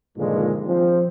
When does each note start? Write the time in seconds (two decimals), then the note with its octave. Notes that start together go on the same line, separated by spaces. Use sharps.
0.17 G2 A#2 D3 D#3 F3 G#3
0.66 F3 C4